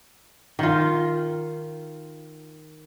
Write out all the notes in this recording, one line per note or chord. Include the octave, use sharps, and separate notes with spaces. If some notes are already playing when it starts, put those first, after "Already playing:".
D#3 F4